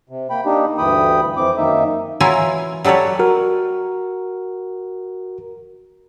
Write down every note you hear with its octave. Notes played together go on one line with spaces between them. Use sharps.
C3
A#3 G5 B5
A#3 D4 D#4 G4
D2 G2 E3 G5 B5 D#6
F2 E3 C4 D6
F#2 D#3 A#3 D#4 E5
E3 F#3 E4 F4 A#4 G#5
F#3 G3 A4 B4 C#5
F#4 A#4